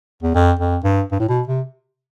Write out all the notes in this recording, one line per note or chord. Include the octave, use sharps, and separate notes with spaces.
E2
F2
F2
G2
G2
A2
B2
C3